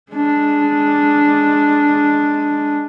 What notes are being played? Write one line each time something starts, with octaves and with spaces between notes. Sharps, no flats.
G#3 D4